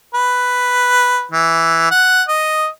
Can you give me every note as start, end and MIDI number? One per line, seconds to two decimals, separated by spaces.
0.14 1.26 71
1.31 1.87 52
1.91 2.23 78
2.28 2.68 75